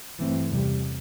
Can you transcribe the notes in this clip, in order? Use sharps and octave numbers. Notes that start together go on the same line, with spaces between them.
G2 E3 A3 C4
E2 C3 G3